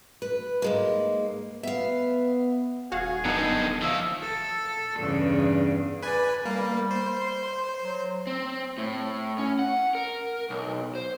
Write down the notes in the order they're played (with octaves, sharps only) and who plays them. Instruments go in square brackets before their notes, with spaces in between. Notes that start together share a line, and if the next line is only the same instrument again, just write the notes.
[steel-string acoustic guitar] B4
G#2 G#3 A#3
[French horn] B3 [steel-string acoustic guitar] E5 F5
[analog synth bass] D#1 [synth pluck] F#4 F5 F#5 [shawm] G#4
[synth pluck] F#2 B3 D#4 [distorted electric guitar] D3 D#3
[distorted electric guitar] D#3 A#3 [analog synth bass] F3 [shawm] E5
[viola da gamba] A4
E2 G2 C#3
[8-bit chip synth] B4 G#5 [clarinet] D5
[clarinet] G3 [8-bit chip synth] A#3
[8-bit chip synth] C5
[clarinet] C6
F#3
[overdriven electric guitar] C4
A2
C#4
F#5
A#4
B1
C5